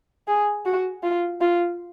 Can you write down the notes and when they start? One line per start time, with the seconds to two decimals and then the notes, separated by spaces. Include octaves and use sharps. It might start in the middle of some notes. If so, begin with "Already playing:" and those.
0.28 G#4
0.66 F#4
1.03 F4
1.41 F4